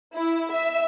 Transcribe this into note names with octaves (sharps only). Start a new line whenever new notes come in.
E4
E5